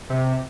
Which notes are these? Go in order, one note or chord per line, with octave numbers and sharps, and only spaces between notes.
C3